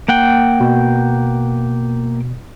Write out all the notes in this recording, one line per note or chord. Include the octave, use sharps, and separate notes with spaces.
A#3 F#5 G5
B2